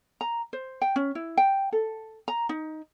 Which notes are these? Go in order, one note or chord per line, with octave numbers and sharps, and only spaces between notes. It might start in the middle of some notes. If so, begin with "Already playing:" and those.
A#5
C5
G5
C#4
E4
G5
A4
A#5
D#4